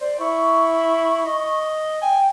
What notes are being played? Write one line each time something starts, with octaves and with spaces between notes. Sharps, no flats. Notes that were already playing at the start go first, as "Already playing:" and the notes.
C5 D5
E4 C#6
D#5
G5 G#5